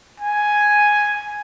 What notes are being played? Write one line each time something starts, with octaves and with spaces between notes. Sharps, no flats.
G#5